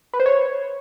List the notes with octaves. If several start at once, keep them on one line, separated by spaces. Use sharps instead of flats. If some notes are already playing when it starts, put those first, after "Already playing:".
B4
C5
C#5